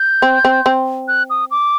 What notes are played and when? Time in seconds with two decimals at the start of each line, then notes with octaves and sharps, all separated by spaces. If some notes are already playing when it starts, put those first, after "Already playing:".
Already playing: G6
0.22 C4
0.45 C4
0.66 C4
1.08 F#6
1.30 D#6
1.51 D6